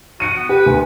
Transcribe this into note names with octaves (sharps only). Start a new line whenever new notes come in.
F#4 F#6 C#7 D#7
B3
G4 B4
D2